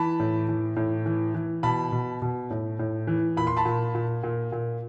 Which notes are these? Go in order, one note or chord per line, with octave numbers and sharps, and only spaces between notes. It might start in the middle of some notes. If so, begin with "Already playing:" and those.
Already playing: E3 A5 B5
A2
E3
A2
E3
E3
B2 A5 B5
B2
B2
A2
A2
E3
A#2 B5
C6
A5 B5
A#2
A#2
A#2
A#2